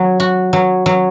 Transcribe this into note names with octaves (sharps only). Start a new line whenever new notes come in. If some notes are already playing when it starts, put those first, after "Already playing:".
Already playing: F#3
F#4
F#3
F#3